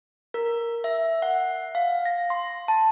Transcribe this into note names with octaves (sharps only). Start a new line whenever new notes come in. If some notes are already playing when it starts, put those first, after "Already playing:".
A#4
E5
F#5
F5
A#6
C6
A5